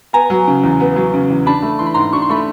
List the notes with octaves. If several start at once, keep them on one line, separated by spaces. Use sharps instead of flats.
B3 G#5 A#5
F#3
C#3
E2
B3
F#3
C#3
E2
D4 A5 B5
A3
E3 C6
B5
G#2 A#5 C6
D4 C#6
C6
A3 B5 C#6